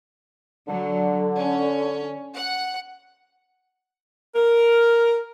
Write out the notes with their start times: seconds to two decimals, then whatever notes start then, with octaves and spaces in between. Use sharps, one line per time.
0.68 D3 F#3
1.36 C#4
2.36 F#5
4.36 A#4